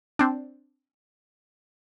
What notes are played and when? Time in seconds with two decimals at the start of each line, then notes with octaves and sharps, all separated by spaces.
0.19 C4 D4